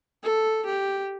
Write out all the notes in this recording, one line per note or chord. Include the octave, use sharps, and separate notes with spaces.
A4
G4